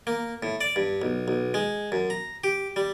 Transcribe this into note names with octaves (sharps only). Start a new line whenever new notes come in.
A#3
A2
D5
G2
B1
B1
G#3
F#2
A#5
G4
G3